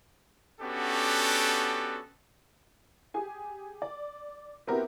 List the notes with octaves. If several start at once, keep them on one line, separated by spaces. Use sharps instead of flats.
B3 C#4 D4 F#4 G4 A4
G4 G#4 G#5
D5
B3 C4 E4 F#4 G4 A#4